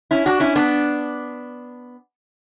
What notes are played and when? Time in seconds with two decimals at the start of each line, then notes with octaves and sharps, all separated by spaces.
0.11 C#4 E4
0.26 D4 F#4
0.40 C#4 E4
0.56 B3 D4